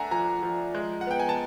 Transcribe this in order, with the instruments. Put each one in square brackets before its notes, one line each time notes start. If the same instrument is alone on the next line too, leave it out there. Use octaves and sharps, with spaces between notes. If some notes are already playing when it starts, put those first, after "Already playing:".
Already playing: [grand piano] A3 D4 E5 F#5 G#5 A#5
F3 G#5 A#5
F3
G#3
F#5
B3 G5
G#5
A5